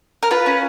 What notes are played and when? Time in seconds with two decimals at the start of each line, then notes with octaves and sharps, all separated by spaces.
0.23 A#4
0.31 F4 B4
0.46 C#4